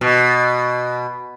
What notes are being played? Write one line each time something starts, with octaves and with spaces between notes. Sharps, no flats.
B2